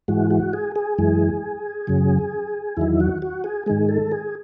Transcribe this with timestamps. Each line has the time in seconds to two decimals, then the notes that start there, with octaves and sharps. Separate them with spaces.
0.08 G#2 E3 G#3 F#4
0.30 F#4
0.53 G#4
0.76 G#4
0.98 F#2 E3 G#3
1.87 F#2 C#3 F#3
2.77 E2 D#3 F#3 E4
3.00 F#4
3.22 F#4
3.44 G#4
3.66 G#2 D#3 G#3 G#4
3.89 A4
4.12 G#4